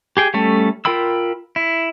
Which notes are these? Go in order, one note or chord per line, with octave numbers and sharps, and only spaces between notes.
G4 G#4 G5
G3 A3 C#4 A4
F4 A#4 G5 B5 E6
E4